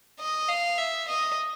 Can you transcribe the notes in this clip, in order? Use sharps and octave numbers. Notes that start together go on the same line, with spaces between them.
D#5
F5
E5
D#5